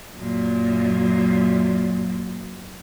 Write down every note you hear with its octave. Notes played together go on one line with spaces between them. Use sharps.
F#2 A#2